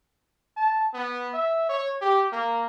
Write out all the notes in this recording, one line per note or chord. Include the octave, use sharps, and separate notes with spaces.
A5
B3
E5
C#5
G4
A#3